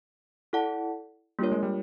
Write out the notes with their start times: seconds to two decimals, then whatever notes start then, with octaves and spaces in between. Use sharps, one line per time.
0.53 E4 A4 D5 F#5 A5
1.39 G3 A#3 D4 F4 A#4 C#5
1.52 G#3
1.63 G3